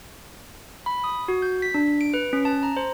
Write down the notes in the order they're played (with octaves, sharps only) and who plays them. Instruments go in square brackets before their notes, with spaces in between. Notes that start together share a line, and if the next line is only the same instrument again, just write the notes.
[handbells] B5
D#6
F#4
G6
B6
D4
D7
B4
C#4
A5
A#5
C5